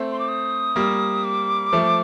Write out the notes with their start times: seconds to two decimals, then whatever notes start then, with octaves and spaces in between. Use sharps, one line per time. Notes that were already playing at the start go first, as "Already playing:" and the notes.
Already playing: A3 C4
0.11 C6
0.19 D6
0.28 D#6
0.76 G3 A#3
1.24 D6
1.73 F3 A3